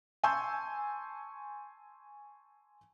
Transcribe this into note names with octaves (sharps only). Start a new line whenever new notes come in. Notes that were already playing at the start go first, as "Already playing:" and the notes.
G#5 A5 C6 C#6 E6 G6